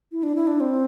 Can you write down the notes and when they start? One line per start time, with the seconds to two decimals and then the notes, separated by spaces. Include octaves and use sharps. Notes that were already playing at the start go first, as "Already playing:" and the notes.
0.12 E4
0.23 D4
0.35 E4
0.47 D4
0.60 C4